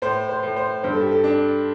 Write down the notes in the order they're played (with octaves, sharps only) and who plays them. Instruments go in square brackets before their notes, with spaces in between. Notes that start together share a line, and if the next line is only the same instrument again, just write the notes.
[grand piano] A2 [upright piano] C5
[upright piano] C5
[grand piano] A2
[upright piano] C5
[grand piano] G2 [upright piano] C5
[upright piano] A4
G4
A4
[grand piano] D4